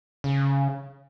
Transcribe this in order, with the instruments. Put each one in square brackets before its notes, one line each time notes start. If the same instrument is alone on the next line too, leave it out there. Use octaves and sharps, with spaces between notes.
[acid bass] C#3